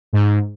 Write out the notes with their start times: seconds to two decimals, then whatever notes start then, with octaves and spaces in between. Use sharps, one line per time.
0.13 G#2